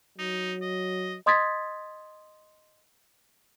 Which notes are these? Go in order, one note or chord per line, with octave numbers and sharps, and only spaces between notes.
F#3 D#4
D#5
D#5 C6 D#6 G#6 A6 B6